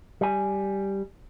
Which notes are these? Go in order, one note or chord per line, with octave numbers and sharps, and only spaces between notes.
G3 G#5